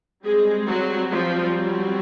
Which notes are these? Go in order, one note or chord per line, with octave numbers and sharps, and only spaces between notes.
G3 G#3 C4 G#4
F#3 F#4
F3 F4
F#3 F#4